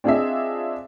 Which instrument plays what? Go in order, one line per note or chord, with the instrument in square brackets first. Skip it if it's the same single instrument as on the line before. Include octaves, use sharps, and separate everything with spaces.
[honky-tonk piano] C4 D4 F4 G#4 D#5 E5